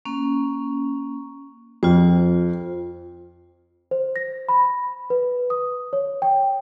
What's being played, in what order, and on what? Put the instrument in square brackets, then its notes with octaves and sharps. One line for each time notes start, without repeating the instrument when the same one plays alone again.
[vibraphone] A#3 C#4
[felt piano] F2 [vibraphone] F4 C5
[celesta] C5
A#6
B5
B4
D#6
C#5
G5